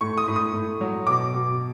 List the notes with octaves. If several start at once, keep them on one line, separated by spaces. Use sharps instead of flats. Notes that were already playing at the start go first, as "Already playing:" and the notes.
A2 C#6
D#6
A2
D#6
A2
F#3
B2 D6
B2